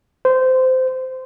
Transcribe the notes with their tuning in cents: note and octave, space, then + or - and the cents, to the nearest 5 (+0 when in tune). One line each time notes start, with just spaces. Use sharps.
C5 -20